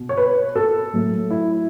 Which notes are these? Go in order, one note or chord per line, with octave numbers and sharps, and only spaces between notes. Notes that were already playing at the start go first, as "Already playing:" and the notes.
Already playing: B2
C#5
B4
A4
A2 F#3 A3
E4